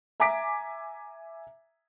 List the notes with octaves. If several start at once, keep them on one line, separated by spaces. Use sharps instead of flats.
E5 G#5 A#5 D6 B6 D7